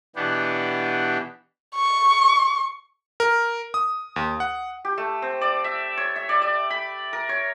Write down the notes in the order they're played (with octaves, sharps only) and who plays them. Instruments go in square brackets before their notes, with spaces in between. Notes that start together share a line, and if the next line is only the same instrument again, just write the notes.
[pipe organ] B2 E3 B3 D4 G4
[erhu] C#6
[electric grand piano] A#4
D#6
D#2
F#5
[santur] G4
A3
C4
D5
E5
C#5
E5
D5
D5
B5
A#4
C#5